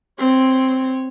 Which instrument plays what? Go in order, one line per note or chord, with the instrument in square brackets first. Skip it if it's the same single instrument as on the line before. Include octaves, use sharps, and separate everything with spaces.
[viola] C4 C#5